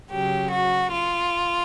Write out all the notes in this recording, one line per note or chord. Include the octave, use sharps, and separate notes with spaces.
C#3 F#3 G4
F#4
F4